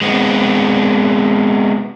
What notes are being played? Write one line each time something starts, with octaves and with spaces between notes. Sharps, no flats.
G#3 B3 C4